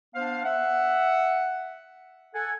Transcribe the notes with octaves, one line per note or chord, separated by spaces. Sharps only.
B3 D4 C5 F5
E5 F#5
A4 F#5 G#5